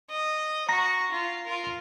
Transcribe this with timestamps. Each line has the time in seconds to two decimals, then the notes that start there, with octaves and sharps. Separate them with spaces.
0.10 D#5
0.69 F#4 A#5 C#6 A#6
1.11 F4
1.45 F4 A#4